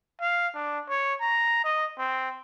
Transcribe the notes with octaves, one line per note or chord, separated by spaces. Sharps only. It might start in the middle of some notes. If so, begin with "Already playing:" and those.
F5
D4
C#5
A#5
D#5
C4